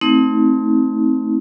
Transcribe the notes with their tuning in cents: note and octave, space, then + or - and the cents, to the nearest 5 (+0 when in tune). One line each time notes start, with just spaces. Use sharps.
A3 +0 C4 +0 D#4 +35